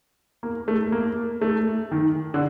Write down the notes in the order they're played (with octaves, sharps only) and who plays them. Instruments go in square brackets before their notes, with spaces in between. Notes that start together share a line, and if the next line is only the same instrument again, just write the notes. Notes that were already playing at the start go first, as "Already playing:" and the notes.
[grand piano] A#3
A3
A#3
A3
D#3
D3